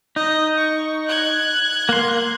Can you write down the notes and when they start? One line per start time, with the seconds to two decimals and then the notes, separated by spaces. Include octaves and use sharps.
0.16 D#4 D#5
0.58 C#6
1.08 F#6 G#6
1.89 A#3 C6